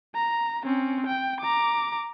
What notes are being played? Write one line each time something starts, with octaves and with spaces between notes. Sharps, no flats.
A#5
C4 C#4
G5
A#5 D6